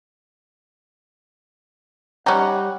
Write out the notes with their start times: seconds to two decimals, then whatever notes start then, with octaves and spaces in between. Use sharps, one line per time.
2.26 G3 C#4 D#4 F#5